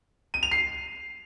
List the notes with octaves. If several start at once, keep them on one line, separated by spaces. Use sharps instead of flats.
D#7
F7
C7